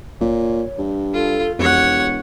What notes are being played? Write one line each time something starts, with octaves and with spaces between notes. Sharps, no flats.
F#1 A#2 C#5
G2
F4 A4
E1 F2 G4 C#5 F#5